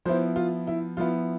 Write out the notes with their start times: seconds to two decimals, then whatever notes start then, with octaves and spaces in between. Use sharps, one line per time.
0.05 F3 B3 E4 C5
0.36 F4
0.67 E4
0.97 F3 B3 E4 F4